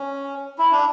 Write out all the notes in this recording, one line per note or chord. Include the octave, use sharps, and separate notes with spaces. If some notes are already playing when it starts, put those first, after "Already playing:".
Already playing: C#4
E4
D4